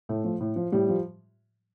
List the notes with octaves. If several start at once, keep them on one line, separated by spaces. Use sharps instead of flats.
A2 A3
F3
A2
F3
A2 G3
F3